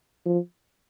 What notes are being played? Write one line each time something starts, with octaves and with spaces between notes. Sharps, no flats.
F3